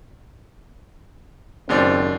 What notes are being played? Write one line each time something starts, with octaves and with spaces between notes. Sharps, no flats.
F#1 D#2 G#2 C4 D5